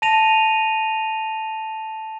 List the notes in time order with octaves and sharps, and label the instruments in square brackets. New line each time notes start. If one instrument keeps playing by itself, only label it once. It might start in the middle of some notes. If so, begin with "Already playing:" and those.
[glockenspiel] A5 A#6 D#7 F7